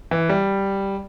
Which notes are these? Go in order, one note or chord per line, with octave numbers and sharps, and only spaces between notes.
E3
G3